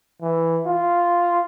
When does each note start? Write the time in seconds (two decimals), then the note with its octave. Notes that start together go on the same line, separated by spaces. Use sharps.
0.22 E3
0.66 F4